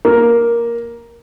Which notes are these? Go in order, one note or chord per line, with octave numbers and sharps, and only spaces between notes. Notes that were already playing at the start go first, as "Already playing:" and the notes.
A#3